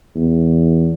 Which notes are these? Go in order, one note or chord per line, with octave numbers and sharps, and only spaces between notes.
E2